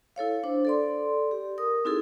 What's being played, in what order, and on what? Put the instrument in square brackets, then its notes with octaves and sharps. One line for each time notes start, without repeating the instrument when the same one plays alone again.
[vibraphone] E4 A4 C#5 F5
D4 C5
A4 D5 C6
G4
A#4 D#6
C4 D#4 E4 F#4 G#4 A4